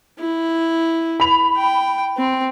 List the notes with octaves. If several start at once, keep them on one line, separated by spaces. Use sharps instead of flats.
E4
B5 F7
G5
C4